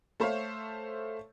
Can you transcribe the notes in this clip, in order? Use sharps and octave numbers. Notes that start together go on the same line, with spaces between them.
A3 A4 C5 C#5 E5 F5